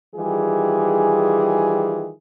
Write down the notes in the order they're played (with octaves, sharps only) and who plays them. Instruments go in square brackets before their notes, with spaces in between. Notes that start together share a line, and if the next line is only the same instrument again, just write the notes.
[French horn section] D#3 E3 G3 F4 G#4